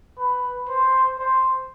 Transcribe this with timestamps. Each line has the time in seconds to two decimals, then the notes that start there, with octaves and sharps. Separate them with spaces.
0.18 B4
0.69 C5
1.19 C5